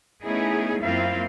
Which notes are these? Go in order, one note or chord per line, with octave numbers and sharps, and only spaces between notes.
A3 B3 C#4 D#4 E4 G#4
F#2 A#3 C4 E4 F4 F5